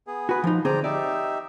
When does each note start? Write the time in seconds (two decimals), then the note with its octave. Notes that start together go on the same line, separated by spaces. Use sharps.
0.07 B3 G#4
0.29 F#4 B4
0.44 F3 D#4
0.65 D3 C4 G#4 D5 G5 A#5
0.84 D#4 G4 D5 E5